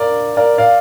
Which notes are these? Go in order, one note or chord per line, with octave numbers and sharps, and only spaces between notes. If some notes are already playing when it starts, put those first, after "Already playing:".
Already playing: A#4 D5
A#4 D5
D5 F5